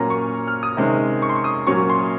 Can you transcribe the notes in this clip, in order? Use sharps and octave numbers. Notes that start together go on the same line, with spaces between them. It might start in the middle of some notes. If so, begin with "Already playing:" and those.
Already playing: A#2 F#3 C#4 A#5
C#6
F6
D#6
C3 D#3 G#3 C#4
C#6
C6
C#6
D#6
A#2 F#3 A#3 C#4 C#6
C6